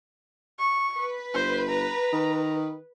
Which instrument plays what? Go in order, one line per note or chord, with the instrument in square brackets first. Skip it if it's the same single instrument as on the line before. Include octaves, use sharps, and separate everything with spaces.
[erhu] C#6
[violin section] B4
[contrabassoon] G1 [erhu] C5
[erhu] A#5
[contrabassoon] D#3